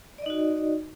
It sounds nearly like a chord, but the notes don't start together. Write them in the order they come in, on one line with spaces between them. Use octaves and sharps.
D5 D#5 D#4 F#4